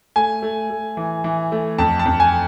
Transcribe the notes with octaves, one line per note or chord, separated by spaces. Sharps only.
A3 G#5
A3
A3
E3
E3
A3
F2 A5
A5
F2
G#5